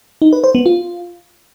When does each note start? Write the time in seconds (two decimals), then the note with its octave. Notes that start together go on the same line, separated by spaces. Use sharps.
0.22 D#4
0.33 B4
0.44 C5
0.55 B3
0.66 F4